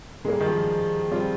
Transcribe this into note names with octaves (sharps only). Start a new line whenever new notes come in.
C#3 G3 G#3 A#3
D#3
F3
G3 C4 F4